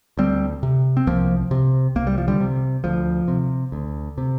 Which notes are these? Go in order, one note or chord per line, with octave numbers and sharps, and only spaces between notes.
D2 G3 C4
C3
C4
C2 F3 A#3
C3
C2 A#3
G3
F3
D3 G3
C3
D2 F3
C3
D2
C3